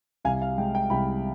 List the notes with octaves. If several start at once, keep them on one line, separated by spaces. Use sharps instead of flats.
C2 F5 G#5
F5
G#3 G5
G5
C2 G5 B5